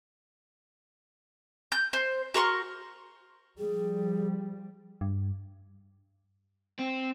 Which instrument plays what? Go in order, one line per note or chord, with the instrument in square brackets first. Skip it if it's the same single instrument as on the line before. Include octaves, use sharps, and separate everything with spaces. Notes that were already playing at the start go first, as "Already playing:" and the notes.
[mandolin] G6
C5
F#4 A#4 C6 C#6
[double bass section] F3 G3 [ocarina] G#4
[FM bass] G2
[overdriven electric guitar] C4